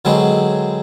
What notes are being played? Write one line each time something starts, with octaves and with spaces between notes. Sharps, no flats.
D3 F#3 G#3 C4 G#4 B4